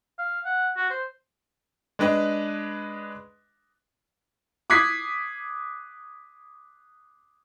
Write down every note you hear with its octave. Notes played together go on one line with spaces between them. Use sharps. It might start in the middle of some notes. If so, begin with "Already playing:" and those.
F5
F#5
F#4
C5
G#3 D4 B4 D#5
D6 D#6 F#6 G#6 B6 C7